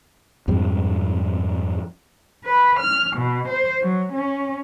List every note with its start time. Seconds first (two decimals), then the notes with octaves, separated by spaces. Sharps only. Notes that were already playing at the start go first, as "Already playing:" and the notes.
0.48 F2 G#2 F3 G3
2.46 B4
2.79 F6
3.17 B2
3.48 C5
3.82 F#3
4.13 C#4